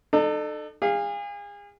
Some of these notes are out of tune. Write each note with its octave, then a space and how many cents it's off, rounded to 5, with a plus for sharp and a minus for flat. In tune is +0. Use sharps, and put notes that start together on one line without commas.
D#4 -45 A4 +0
G#4 -35 F5 +0